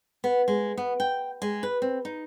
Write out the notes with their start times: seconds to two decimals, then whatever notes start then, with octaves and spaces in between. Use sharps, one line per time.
0.24 B3
0.48 G#3
0.78 B3
1.00 G5
1.42 G#3
1.63 B4
1.82 C4
2.05 D#4